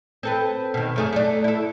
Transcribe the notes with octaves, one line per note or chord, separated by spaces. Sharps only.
C4 A4 B4
B2 D#3
F#2 A3 G#4
A3 D4
E4 A4